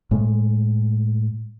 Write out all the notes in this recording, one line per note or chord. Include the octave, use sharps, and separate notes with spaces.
A2 G#3